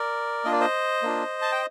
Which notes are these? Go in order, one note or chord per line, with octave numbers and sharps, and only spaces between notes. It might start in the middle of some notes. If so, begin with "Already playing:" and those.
Already playing: A#4 D5
A#3 D4 F4 D#5
D5
C5 D#5
A#3 D4 F4
A5
G5